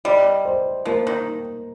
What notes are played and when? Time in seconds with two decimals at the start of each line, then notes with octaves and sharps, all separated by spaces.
0.05 G3 D#5
0.45 C5
0.85 F3 A#3
1.07 D#3